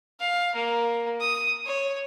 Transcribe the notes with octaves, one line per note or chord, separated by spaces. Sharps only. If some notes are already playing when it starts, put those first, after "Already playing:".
F5
A#3
D#6
C#5